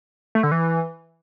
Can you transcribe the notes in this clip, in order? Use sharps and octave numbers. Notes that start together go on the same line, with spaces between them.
A3
D3
E3